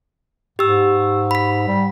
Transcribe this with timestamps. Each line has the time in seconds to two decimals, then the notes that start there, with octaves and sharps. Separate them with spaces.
0.59 G#2 G4 E6
1.31 B5 B6
1.68 G3